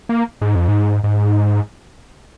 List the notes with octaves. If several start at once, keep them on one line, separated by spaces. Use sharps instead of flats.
A#3
G#2
F2
G#2
G#2